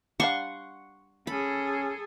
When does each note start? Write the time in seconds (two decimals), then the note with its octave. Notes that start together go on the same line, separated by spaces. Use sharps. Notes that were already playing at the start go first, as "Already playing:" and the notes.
0.20 G3 D4 F5 F#5 C6 C#6
1.27 C#4 G#4 A4 B5